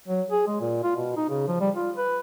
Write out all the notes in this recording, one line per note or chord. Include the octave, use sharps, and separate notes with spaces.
F#3
G#4
G#3
A#2
F4
B2
D#4
C#3
F3
G3
F4
B4